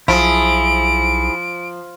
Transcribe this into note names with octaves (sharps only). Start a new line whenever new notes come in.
B1 F3 E4 G#4 D7